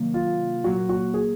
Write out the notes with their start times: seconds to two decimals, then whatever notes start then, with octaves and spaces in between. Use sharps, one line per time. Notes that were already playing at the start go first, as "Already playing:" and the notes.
Already playing: C3 D#3 F#3 A#3
0.14 F4
0.64 A#2 F#3 A#3 F#4
0.89 F#4
1.14 G#4